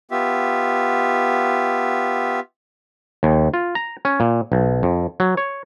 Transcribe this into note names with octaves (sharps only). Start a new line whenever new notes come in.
B3 F4 G4 E5
D#2
F4
A#5
C#4
A#2
B1
F2
F#3
C#5